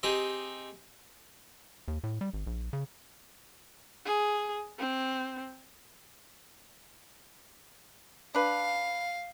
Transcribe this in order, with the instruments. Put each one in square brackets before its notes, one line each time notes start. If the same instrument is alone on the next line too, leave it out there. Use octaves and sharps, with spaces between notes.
[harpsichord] C4 D#4 G4 G#4
[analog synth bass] D#2
A2
G3
G#1
A#1
C#3
[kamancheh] G#4
C4
[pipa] D4 B4 [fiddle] F5